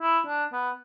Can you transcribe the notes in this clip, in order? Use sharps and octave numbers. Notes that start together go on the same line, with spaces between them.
E4
D4
B3